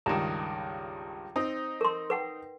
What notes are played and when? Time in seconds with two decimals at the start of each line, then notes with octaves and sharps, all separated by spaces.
0.06 C#2 G2 D#3 A#5
1.36 C4 D#4
1.81 A#4 C6
2.10 B4 F#5 G5